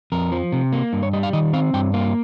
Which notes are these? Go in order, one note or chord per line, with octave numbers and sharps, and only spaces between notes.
F2 A#4
F3
C3
A#3
G2
C#5
G3 D#5
F5
D#3 D#5
C4 F5
G2 G5
A#3 F5